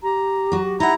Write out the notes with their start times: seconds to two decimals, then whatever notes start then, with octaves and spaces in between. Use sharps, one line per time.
0.03 G4 A#5
0.52 F#3 F#4
0.80 D#4 E4 F#5 A#5